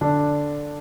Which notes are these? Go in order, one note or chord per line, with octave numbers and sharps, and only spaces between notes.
D3 D4